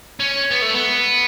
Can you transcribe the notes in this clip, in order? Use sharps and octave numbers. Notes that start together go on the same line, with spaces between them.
C#4
B3
A3
B3